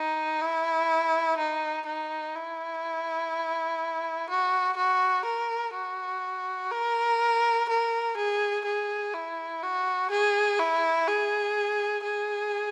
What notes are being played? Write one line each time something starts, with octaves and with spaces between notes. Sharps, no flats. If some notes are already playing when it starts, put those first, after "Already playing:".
Already playing: D#4
E4
D#4
D#4
E4
F#4
F#4
A#4
F#4
A#4
A#4
G#4
G#4
E4
F#4
G#4
E4
G#4
G#4